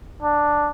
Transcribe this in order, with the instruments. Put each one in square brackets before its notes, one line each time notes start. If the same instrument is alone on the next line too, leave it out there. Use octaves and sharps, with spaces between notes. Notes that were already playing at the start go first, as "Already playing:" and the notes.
[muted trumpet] D4